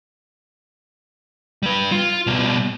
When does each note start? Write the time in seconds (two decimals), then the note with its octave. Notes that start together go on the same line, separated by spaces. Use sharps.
1.63 G3 B4
1.92 F4
2.27 B2 G3